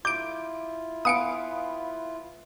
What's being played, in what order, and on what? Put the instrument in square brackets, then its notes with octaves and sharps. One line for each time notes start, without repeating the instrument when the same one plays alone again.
[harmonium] E4 F4 [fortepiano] D6 [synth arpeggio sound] G6 D7
[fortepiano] B3 F5 G#5 [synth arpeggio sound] D#6 C#7 D7